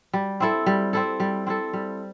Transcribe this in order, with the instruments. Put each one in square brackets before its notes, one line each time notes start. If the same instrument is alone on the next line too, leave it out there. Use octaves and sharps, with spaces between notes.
[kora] G3
C4 E4 A4
G3
C4 E4 A4
G3
C4 E4 A4
G3